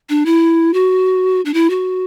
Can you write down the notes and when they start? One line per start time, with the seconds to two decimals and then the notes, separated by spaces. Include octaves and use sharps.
0.09 D4
0.26 E4
0.74 F#4
1.45 D4
1.54 E4
1.70 F#4